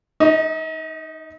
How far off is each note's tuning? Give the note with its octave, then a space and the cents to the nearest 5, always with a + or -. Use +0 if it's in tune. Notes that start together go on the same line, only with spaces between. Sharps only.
D#4 +0 D#5 +45